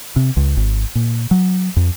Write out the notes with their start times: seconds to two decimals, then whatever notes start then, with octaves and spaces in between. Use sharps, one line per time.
0.16 C3
0.37 C#2
0.57 G#1
0.95 A#2
1.31 F#3
1.76 F2